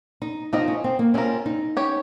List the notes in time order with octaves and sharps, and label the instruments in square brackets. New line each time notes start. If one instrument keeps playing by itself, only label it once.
[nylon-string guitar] D#4
[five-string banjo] F3 C4 F4 A#4 D#5 [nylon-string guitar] D#4
[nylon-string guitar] C#4
C4
A#3
[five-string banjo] G3 C4 F4 A#4 [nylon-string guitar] C#4
[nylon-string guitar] D#4
[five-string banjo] C#4 G4 C#5